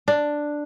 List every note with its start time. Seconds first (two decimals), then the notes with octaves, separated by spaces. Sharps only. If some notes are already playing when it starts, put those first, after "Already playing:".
0.08 D4